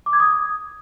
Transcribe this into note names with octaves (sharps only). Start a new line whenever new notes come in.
D6
G#6
D#6